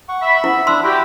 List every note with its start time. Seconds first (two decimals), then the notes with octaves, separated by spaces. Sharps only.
0.09 F#5 C#6
0.22 E5 B5
0.44 B3 E4
0.67 D4 C6 E6
0.84 E4 F#4 G4